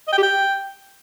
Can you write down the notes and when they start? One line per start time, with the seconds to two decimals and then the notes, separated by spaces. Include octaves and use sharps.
0.08 D#5
0.13 G5
0.18 G4
0.23 G5